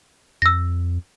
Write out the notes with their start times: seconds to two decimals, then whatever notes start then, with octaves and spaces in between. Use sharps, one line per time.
0.42 F2 E6 A#6